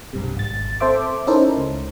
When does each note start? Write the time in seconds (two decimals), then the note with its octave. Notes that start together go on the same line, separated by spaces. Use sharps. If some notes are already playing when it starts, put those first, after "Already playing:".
0.13 B1 G2 C3
0.37 G#1 A6
0.80 C4 A4 C5 E5 D6
1.27 C#4 D#4 E4 A4 A#4 C5
1.57 C#2